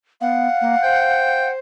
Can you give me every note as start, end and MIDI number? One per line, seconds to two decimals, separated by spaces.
0.21 0.47 59
0.21 1.47 77
0.21 1.51 78
0.61 0.75 58
0.83 1.59 72
0.83 1.50 79